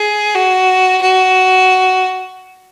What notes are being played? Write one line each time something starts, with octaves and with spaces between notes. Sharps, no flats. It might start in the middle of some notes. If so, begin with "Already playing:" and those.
Already playing: G#4
F#4
F#4